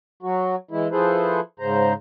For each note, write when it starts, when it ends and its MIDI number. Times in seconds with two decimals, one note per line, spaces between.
0.23 0.55 54
0.23 0.55 66
0.71 0.88 52
0.71 0.88 56
0.71 0.88 64
0.91 1.40 53
0.91 1.40 64
0.91 1.40 68
0.91 1.40 69
0.91 1.40 71
0.91 1.40 72
1.59 1.93 44
1.59 1.93 49
1.59 1.93 72
1.59 1.93 82